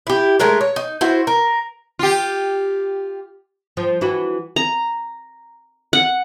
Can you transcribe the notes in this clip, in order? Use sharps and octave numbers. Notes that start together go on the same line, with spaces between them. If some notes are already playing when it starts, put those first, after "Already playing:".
E4 G4
G#3 A3 D4 A#4
C#5
D#4
E4 F#4 C5
A#4
F4 G4
F3
E3 E4 F#4
A#5
F#5